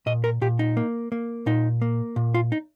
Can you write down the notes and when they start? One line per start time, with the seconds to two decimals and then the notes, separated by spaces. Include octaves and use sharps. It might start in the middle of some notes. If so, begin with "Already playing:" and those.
0.06 A#2 D#5
0.24 A#4
0.41 A#2 G4
0.59 D#4
0.77 A#3
1.12 A#3
1.46 A#2 D#4
1.82 A#3
2.16 A#2
2.34 F4
2.52 D#4